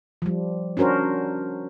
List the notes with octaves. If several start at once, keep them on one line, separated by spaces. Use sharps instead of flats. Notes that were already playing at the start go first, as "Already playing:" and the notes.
F3 G3
C#4 D4 F#4 A#4 C5